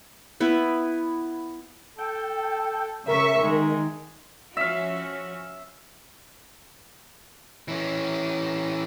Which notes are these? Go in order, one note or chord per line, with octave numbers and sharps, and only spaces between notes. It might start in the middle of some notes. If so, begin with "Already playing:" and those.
B3 E4 B4
A4 G5
C#3 A#4 E5 C#6
D#3 G#3
F3 C#4 F#4 E5 F5
E3 C#4